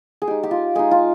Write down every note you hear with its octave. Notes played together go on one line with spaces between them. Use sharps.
G#4
G#3 D#4 G4
G4
F4
G#3 D#4 G#4
F4